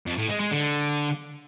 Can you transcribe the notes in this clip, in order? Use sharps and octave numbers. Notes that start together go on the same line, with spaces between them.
F2
A2
G#3
G#3
D3